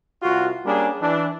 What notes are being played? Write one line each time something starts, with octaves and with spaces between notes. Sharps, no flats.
C2 F4 F#4
G3 A#3 C#4 D4 G#4
E3 D4